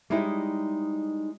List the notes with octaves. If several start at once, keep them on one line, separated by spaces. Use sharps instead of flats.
G3 G#3 D#4 E4 C#5 D#5